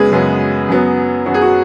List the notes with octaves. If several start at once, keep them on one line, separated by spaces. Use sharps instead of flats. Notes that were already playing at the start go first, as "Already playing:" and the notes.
Already playing: F#2 C#3 G#3 B3 G#4 B4
F#2 C#3 G#3 B3
F#2 F#3 B3
F#2 F#3 B3 F#4
G#4
F#4